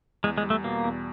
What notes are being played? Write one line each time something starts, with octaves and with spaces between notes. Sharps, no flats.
E2 G#3
G#3
G3
A3
B2 A#3
E2